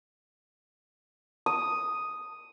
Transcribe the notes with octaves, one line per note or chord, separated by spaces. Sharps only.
D#6